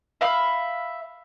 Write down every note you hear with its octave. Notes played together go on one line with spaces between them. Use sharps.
E5 F5 B5